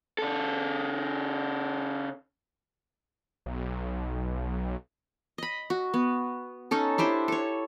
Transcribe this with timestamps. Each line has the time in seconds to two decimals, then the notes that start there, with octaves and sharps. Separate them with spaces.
0.18 C#3 A4
3.46 B1
5.38 D#5 B5
5.70 F#4
5.94 B3
6.71 C#4 D#4 A4
6.98 D4 E4 G4 C5
7.28 A4 C#5